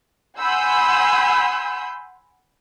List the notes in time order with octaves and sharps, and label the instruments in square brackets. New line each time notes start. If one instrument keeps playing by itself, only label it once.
[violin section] F#5 G#5 B5 C6 E6 G6